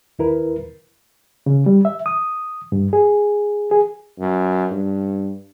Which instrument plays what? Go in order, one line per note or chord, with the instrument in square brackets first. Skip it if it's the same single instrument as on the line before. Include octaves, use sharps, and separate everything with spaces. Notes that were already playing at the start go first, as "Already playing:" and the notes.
[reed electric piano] D#2 E4 A#4 B4
C#3
G3
E5
D#6
G2
G#4
G#4
[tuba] F#2
G2